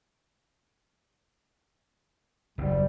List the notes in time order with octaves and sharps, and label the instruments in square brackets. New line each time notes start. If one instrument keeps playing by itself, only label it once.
[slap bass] F#1 D#2 [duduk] G3